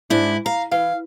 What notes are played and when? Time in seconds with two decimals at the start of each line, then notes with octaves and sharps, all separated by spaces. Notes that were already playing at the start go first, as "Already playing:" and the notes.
0.10 G#2 D4 E4
0.46 F5 A#5
0.72 E3 F5